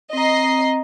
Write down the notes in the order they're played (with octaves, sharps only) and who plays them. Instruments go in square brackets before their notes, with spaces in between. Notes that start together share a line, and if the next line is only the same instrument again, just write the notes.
[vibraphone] C4 A#5 [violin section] D#5 C7